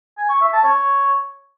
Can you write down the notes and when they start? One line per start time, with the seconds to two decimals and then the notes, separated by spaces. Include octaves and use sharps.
0.18 G#5
0.29 C#6
0.41 E5
0.53 A5
0.65 C#5